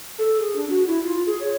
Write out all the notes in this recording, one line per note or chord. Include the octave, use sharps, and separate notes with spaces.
A4
G#4
D4
F#4
E4
F4
G#4
C#5